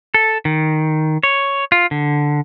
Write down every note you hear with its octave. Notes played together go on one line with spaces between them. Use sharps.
A4
D#3
C#5
F4
D3